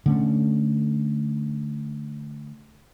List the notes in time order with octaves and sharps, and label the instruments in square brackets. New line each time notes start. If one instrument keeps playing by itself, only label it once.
[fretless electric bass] D3 A3 C#4